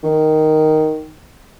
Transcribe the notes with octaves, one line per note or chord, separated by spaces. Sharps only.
D#3